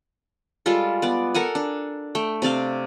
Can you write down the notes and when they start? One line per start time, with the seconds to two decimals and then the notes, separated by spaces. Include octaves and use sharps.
0.66 G3 G#3 F4 A4
1.02 B3 D5
1.35 A4 A#4 F#5 G#5
1.55 D4
2.15 A3 G5
2.42 C3 C4 D5 F5